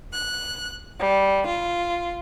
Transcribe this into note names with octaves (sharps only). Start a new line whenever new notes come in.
F#6
G3
F4